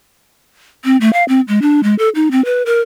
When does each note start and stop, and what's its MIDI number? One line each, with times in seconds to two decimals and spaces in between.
0.85 0.97 60
1.01 1.12 57
1.13 1.24 77
1.29 1.41 60
1.48 1.61 56
1.62 1.81 62
1.83 1.95 56
1.99 2.09 69
2.15 2.31 63
2.31 2.43 60
2.45 2.62 71
2.66 2.81 70